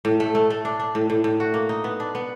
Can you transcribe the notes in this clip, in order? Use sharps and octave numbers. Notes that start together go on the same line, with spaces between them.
A2
A3
A3
A3
D4
D4
A2
A2
A2
F#4
A#3
D#4
B3
D4
B3